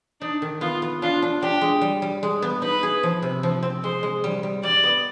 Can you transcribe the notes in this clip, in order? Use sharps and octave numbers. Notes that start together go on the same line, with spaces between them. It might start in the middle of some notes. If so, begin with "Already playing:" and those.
D4 D#4
D#3
B3 F4
B3
D4 F4
D4
D4 G4
G#3
G3
G3
G#3
B3
D#4 B4
G#4
F3
C3
F3
C4
G#3 C5
G#3
G3
G3
G3 D5
B3